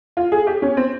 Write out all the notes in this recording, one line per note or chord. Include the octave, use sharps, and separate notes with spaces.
F4
G#4
G4
C#4
C4